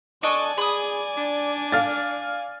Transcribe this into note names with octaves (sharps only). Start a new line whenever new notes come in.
D4 A4 D5 D#5 G#5 C#6
G#4 B5 D#6
D4
F5 F6 A6